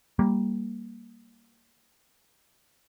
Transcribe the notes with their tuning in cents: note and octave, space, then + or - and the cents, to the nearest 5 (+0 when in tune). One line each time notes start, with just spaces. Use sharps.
G3 +5 A#3 +0